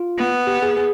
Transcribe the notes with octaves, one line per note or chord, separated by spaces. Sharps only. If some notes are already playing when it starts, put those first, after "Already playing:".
Already playing: F4
B3
G4
G#4
G#4